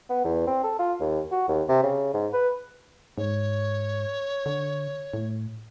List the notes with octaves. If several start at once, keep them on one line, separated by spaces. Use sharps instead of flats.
B3
E2
C4
A4
F4
D#2
F#4
D#2
C3
C#3
G#2
B4
G#2 C#5
D3
A2